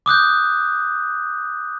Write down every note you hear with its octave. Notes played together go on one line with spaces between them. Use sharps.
D6 D#6 F#6 G6